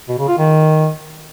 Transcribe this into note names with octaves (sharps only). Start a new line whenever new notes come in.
B2
C#3
F4
D#3